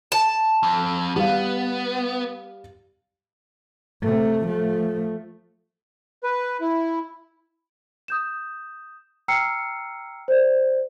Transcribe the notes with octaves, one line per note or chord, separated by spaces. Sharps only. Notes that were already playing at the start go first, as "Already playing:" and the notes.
A5
F2
G3 B3 F5
C3 A3
F3 A3
B4
E4
D#6 G6 E7
G5 A#5 E6 F6 C7 C#7
C5 D5